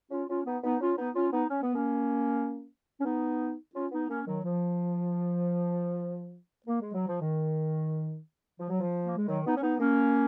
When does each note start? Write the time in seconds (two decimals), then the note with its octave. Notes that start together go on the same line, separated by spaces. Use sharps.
0.11 C#4 F4
0.29 C#4 F4
0.45 B3 D#4
0.63 B3 D#4
0.80 C#4 F4
0.98 B3 D#4
1.15 C#4 F4
1.32 B3 D#4
1.50 C#4
1.62 B3
1.75 A#3 C#4
3.01 C#4
3.05 B3 D#4
3.74 C#4 F4
3.92 B3 D#4
4.09 A#3 C#4
4.26 D#3 F#3
4.44 F3
6.67 A#3
6.80 G#3
6.94 F#3
7.07 F3
7.21 D#3
8.59 F3
8.70 F#3
8.81 F3
9.05 A#3
9.17 G#3
9.28 D#3 F#3
9.46 B3 D#4
9.57 C#4
9.63 B3 D#4
9.80 A#3 C#4